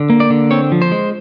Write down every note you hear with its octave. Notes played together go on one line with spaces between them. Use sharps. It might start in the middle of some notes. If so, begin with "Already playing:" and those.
Already playing: D3
A#3
D5
D3
C4 C#5
F3
C5
G#3